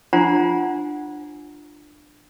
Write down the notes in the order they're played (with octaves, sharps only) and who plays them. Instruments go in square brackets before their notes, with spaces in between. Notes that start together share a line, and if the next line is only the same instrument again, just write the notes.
[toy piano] D4 F4 C5 F#5 G#5 A#5